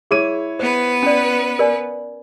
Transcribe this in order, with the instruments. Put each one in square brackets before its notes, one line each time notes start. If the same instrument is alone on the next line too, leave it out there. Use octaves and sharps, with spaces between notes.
[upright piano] E4 C#5 D#7 [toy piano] G#4 D6
[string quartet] B3 B4 [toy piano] C5
[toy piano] C#4 D5
A#4 D5 G#5